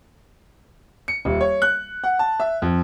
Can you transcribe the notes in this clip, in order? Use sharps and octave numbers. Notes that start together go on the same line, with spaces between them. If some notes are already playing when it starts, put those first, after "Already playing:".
C#7
D#1
C#5
F#6
F#5
A5
E5
F2